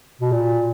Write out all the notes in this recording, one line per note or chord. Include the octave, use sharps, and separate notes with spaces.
B2
A#2